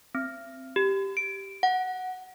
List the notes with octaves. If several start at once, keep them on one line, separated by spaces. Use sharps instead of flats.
C4
G4
D7
F#5